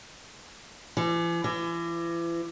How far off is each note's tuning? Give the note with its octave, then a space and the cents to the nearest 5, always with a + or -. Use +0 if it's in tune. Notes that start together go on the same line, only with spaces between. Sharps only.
E3 +45
E3 +40